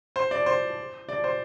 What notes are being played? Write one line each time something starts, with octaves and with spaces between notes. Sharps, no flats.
C5
D5
C5
D5
C5